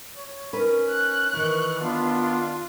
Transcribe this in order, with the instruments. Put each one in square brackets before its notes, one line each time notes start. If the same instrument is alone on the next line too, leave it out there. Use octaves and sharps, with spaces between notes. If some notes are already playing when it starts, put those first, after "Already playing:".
[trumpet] C#5
[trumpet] C#4 [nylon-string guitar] D#4 A#4 B4
[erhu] F#6
[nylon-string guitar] D#3 E4 [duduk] E3 [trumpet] C#6
[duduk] B3 [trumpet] D4 [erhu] F4